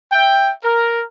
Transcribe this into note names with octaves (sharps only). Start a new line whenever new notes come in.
E5 G5
A#4